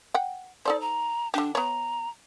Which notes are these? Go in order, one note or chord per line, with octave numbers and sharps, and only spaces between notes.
F#5 G5
D#4 A4 C5 D5
A#5
D3 D4 G4
B3 C#5 A#5